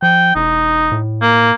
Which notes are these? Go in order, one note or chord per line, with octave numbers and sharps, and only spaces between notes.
F3 G5
E1 D#4
A2
A#3